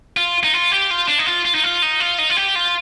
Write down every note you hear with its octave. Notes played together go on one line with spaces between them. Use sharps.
F4
D#4
F4
G4
F4
D4
D#4
F4
F4
D#4
F4
D#4
F4
D#4
F4
G4
F4